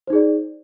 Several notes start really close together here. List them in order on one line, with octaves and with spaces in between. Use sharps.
C5 D#4 G#4 D5